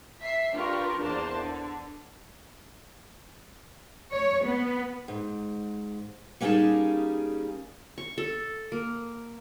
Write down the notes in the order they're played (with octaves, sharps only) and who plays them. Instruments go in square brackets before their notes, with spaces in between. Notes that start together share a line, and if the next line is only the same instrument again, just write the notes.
[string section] E5 B6 C7
D4 F4 G4 A#4 B4 C#6
E2 A#3 D4 C5 A5
D3
[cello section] C#5
B3
[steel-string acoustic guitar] G#2
G3 A#3 C#4 D#4 G#4 A5
[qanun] C#6
A4
A#3